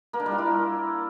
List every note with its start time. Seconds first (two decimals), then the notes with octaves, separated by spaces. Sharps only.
0.13 A#3
0.20 D4
0.26 G3
0.32 F4
0.38 E4